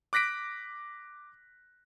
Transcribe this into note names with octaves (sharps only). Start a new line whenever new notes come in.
D6 F#6 A#6 B6 D7